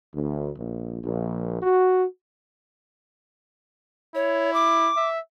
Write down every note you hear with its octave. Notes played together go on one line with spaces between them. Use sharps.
D2
A#1
A#1
F#4
E4 C#5
D6
E5